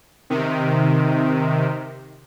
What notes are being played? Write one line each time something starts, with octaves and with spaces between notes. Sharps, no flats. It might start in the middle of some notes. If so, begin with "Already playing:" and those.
C3 D#3